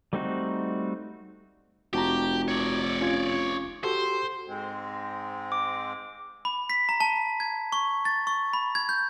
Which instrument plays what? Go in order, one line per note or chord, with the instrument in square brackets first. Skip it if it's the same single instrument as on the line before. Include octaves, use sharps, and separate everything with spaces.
[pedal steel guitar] G3 A3 C4 D#4 F#4
[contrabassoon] F1 [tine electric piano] F#4 A5 A#5 [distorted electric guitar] G4
[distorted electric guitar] C#5 D5
[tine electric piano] C#4 F4 G#6
[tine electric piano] F#4 G4 A4 [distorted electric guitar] C5
[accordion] G#2 G#3 C4
[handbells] D6
[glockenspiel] B5
B6
A#5
A5
G#6
C#6
A6
C#6
B5
G#6
G6